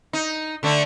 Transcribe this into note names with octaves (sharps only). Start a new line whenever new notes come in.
D#4
D3 A3 D4